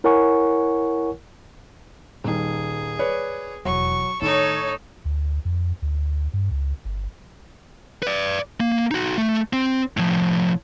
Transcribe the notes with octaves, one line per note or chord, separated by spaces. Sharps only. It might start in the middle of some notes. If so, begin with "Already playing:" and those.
E4 A#4 C#5 F#5 G#5 C#6
D#1 D#3 G#4
B4 C#5 D5
E1 F2 F#3 C#6
A2 D#3 D#4 A4 C#5 C#6
D2
F2
D2
G2
C#2
G1
B4 D5
A#3
D#4 F#4
A3
C4
A2 F3